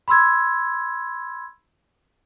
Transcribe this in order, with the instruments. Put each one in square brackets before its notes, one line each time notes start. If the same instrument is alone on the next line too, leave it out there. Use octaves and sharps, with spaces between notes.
[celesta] B5 C6 E6 G#6